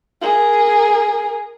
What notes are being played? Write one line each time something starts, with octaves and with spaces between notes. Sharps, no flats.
G#4 A#4